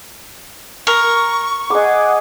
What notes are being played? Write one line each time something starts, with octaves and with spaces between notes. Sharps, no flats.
A#4 C#6
G#4 D#5 F#5 D6